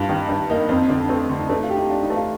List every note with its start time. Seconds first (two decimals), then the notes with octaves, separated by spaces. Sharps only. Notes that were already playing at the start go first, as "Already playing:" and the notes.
Already playing: G2 F4
0.09 D#3 D#4
0.29 G2 D4
0.49 A#3 D#4
0.69 F2 C4
0.89 D3 D4
1.09 A3 C4
1.29 D3
1.40 D#4
1.49 A3 D4
1.63 F4
1.69 G4
1.77 D#4
1.90 D4 F4
2.03 D#4
2.10 A3
2.16 F4